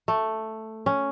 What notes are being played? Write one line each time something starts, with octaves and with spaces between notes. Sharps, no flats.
A3
C#4